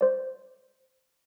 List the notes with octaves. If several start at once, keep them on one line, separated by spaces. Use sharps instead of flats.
C5 D5